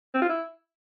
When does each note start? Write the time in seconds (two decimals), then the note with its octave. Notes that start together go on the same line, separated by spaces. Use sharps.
0.14 C4
0.22 F4
0.29 E4